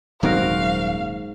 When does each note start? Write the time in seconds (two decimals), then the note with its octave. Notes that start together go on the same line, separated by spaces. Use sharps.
0.23 D#1 G#2 F#3 C4 F#4 A#4 F5